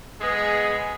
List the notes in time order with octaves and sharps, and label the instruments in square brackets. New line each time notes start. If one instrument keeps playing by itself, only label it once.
[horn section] G#3 B3 G#4